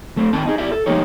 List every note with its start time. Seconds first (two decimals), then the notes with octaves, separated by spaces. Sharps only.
0.17 A3 C4
0.33 D#3 C4 A5
0.46 D#4 G#4
0.58 E4 G4 D5 E5
0.72 A4
0.86 F3 G#3 A#3 D#4 G4 C#5